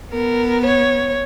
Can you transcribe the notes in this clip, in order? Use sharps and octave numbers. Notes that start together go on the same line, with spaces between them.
B3 A#4
C#5